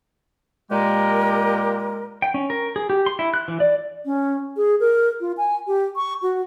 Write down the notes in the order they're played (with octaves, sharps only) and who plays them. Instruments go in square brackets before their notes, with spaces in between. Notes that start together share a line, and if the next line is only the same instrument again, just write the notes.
[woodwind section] A#2 G#3 G4 A#4
[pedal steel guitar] G5
C#4
A#4
G#4
G4
C6
E4
F#6
E3
D5
[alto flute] C#4
G#4
A#4
F4
G#5
G4
C#6
F#4